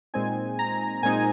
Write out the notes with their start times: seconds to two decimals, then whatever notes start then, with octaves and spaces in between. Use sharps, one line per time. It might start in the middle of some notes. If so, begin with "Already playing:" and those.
0.14 A#2 G#3 C4 D#4 G#5
0.59 A#5
1.03 A#2 G#3 C4 D#4 G#5